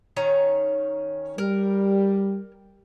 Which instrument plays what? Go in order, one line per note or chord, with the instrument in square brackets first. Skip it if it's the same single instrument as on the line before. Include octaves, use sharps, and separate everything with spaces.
[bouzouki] D#3 C#4 A#5
[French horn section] G3 [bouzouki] A#4